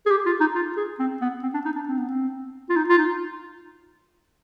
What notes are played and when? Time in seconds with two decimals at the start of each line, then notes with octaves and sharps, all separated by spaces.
0.06 G#4
0.11 G4
0.26 F4
0.40 D#4
0.55 F4
0.77 G#4
0.99 C4
1.21 B3
1.43 C4
1.54 D4
1.65 D#4
1.76 D4
1.88 C4
1.97 B3
2.08 C4
2.69 F4
2.76 D#4
2.89 F4
2.98 D#4